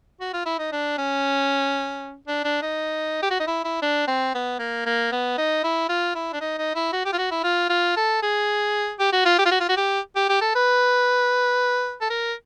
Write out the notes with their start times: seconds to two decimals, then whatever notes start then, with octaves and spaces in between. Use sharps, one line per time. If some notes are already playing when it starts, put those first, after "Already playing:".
0.20 F#4
0.33 F4
0.46 E4
0.59 D#4
0.72 D4
0.98 C#4
2.27 D4
2.44 D4
2.62 D#4
3.22 G4
3.30 F#4
3.40 D#4
3.47 E4
3.64 E4
3.82 D4
4.08 C4
4.34 B3
4.59 A#3
4.86 A#3
5.12 B3
5.38 D#4
5.63 E4
5.89 F4
6.15 E4
6.33 D4
6.41 D#4
6.58 D#4
6.75 E4
6.93 F#4
7.05 G4
7.13 F4
7.18 F#4
7.31 E4
7.44 F4
7.69 F4
7.96 A4
8.22 G#4
8.99 G4
9.12 F#4
9.25 F4
9.39 G4
9.46 F4
9.51 F#4
9.60 F4
9.69 F#4
9.77 G4
10.16 G4
10.29 G4
10.41 A4
10.55 B4
12.01 A4
12.10 A#4